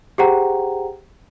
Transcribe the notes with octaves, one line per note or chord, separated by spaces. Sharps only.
G4 G#4 C5 F#5 G5 A#5